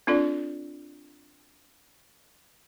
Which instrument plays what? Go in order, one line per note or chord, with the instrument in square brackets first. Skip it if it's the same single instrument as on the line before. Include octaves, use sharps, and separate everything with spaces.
[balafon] C4 D4 F4 A4 D5